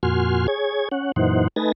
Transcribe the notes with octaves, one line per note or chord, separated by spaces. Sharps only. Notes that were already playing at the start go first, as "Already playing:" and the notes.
F2 A#2 F#4 G#5 C6 F6
G#4 C#5 G#6
C#4 F#5
F#2 A#2 E3 D#4 C5 F#5
A3 D#4 B4 G#5 A6 A#6